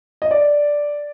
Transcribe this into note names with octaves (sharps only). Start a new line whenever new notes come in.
D#5
D5